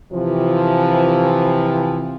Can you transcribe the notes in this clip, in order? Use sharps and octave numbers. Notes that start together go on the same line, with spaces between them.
C3 E3 F3